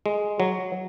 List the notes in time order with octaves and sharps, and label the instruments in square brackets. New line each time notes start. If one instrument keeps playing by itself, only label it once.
[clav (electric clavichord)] G#3
F#3